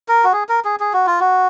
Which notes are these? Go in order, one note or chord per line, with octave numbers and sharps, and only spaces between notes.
A#4
F#4
G#4
A#4
G#4
G#4
F#4
F4
F#4